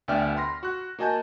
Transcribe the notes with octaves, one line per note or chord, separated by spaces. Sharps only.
D2 B3 D5 E5 G5 F6
B5 C6 A#6
F#4 F#6
A#3 F#4 D#5 G#5 A5 G6